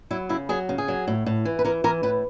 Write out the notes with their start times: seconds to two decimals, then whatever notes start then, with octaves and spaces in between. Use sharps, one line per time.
0.11 F#3 E4
0.29 C#3 E4
0.49 F#3 G#4
0.69 C#3
0.78 G#4
0.88 F#3
1.08 A2
1.26 A2
1.45 E3
1.59 B4
1.65 E3 A#4
1.84 E3 A#4
2.03 A2 B4